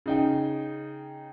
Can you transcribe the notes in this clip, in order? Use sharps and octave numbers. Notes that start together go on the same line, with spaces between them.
C#3 D#4 G5